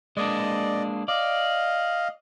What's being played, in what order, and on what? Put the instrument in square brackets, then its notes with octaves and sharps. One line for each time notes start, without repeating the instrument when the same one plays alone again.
[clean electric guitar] G#3 A#3 D4 [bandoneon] D5 D#5
[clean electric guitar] D5 [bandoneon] D#5 F5